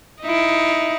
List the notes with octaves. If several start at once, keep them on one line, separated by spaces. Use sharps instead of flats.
D#4 E4